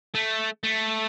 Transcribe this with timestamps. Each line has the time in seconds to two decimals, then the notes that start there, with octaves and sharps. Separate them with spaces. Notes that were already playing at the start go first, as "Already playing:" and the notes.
0.15 A3
0.64 A3